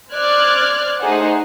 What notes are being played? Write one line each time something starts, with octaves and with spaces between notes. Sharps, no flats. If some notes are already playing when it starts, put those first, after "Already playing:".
C5 D5 F6 F#6 G#6
A3 D#4 G#4 C5 F#5